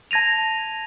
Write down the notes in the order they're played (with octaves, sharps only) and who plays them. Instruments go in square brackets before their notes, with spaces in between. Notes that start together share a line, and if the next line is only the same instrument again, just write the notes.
[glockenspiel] A5 G#6 A#6 D#7 F7